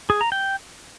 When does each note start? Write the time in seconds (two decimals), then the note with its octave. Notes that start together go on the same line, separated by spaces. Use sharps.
0.10 G#4
0.21 A#5
0.32 G5